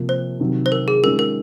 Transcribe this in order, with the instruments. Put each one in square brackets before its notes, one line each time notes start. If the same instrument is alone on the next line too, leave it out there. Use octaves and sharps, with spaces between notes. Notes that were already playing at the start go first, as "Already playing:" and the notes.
Already playing: [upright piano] C3 F3 A#3
[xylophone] C5
[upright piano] C3 D#3 F#3
[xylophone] C5
A#4
G#4
[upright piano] D#3 G#3 C#4 F4 [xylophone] A#4
[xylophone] A#4